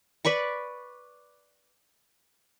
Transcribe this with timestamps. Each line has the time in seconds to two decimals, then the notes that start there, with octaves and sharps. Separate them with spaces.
0.25 B4 D5 B5 C#6